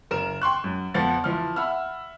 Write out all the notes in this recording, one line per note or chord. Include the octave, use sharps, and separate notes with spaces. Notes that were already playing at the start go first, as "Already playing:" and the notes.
F#1 A#4 F6 E7
G5 C6 C#6 F#6
F#2
F2 F3 B3 F#5 A6
E3 F3 F6
E5 F#5 B5 E6 F6